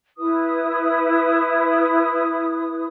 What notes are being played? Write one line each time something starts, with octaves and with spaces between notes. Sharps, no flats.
E4 B4 D#6